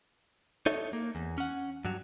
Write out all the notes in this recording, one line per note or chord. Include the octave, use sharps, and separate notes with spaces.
D#4 A4 C#5 E5
A#3
E2
C#4 F#5
G2 F#3